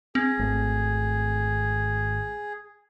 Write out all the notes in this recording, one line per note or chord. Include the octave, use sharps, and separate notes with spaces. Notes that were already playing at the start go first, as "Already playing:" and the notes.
C4 G#4
G#1 A3